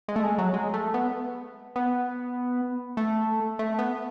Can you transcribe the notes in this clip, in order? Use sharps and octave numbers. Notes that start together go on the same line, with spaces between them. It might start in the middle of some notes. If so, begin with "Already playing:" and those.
G#3
A3
G#3
F#3
G#3
A3
B3
B3
A3
A3
B3